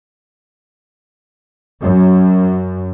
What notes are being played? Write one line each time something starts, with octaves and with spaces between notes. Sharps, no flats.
F#2